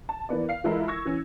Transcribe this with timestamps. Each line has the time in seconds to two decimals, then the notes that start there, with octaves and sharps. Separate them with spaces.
0.09 A5
0.29 E3 A#3 B3 D5
0.49 F5 C7
0.64 E3 G#3 E4 F4 A4 A#4
0.88 C#6 E6 G#6 A#6
1.05 E3 C#4